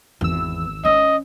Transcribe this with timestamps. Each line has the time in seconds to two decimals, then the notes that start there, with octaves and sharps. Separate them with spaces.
0.21 G#1 E2 E6
0.85 C#4 D#5